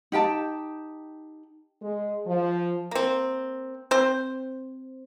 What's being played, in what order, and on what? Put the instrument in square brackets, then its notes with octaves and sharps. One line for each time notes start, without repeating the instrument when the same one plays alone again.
[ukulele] D#4 G4 G5 A5
[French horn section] G#3
F3
[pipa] A#3 C4
C4 C5